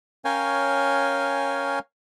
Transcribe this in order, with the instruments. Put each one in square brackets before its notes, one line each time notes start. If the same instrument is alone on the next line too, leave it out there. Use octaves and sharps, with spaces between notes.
[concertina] C#4 A#4 C#5 F5 G5 G#5